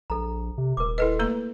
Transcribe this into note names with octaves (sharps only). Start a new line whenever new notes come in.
A#1 A4 A#5
C3
D#1 A#4 D6
E4 A4 B4 D#5
A3 A#3 A#5